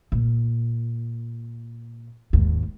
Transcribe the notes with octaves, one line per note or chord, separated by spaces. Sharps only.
A#2
D#2 G#2